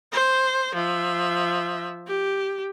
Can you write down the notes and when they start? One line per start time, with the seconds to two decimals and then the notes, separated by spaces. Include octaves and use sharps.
0.12 C5
0.75 F3 E5
2.07 G4